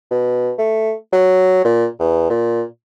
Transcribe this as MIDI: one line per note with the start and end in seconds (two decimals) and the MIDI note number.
0.11 0.51 47
0.59 0.93 57
1.13 1.65 54
1.65 1.86 46
2.00 2.28 40
2.30 2.63 46